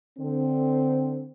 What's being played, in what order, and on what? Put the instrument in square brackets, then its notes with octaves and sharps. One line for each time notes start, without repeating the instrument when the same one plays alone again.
[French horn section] D3 C4